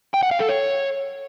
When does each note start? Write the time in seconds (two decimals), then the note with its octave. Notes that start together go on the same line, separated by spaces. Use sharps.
0.14 G5
0.23 F#5
0.31 F5
0.40 A4
0.49 C#5